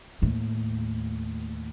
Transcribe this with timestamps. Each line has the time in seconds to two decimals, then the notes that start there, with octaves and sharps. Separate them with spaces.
0.22 D#2 A2